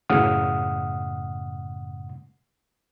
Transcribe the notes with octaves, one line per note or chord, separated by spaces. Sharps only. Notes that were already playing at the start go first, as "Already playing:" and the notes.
F#2 A2 C#3 F#5 D#6 F6